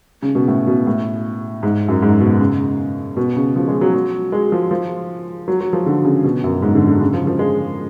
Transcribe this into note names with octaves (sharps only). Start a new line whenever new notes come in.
C#3
B2
A2
B2
A2
G#2
F#2
G#2
B2
C#3
B2
C#3
F3
G#3
F#3
F#3
G#3
F3
F3
F#3
F#3
F3
D3
C#3
B2
F#2
G#2
D3
D3
C#3
F3
F3
G#3